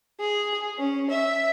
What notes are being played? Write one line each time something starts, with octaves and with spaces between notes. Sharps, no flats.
G#4
C#4
E5